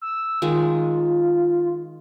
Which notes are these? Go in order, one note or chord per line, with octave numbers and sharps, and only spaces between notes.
E6
D#3 G#3 F4